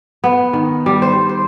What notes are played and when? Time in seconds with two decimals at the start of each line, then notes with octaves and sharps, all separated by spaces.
0.24 B3
0.53 D#3
0.86 G3
1.02 C5
1.29 C5